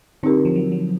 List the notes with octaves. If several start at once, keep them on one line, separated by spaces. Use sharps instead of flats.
D3 C4 D#4 G4 A#4
F3
F#3
F#3